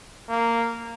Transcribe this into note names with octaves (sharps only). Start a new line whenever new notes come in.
A#3